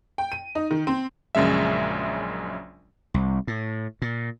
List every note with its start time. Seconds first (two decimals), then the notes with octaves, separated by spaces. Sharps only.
0.18 G5
0.32 D#7
0.55 D#4
0.71 D#3
0.87 C4
1.35 A#1 F#2 C#3 G#3 E5
3.14 C2
3.47 A2
4.02 A#2